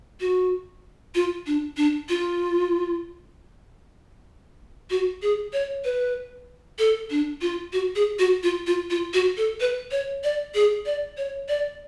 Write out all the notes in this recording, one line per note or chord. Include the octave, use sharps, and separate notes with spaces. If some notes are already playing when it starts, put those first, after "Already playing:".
F#4
F4
D4
D4
F4
F#4
G#4
C#5
B4
A4
D4
F4
F#4
G#4
F#4
F4
F4
F4
F#4
A4
B4
C#5
D5
G#4
D5
C#5
D5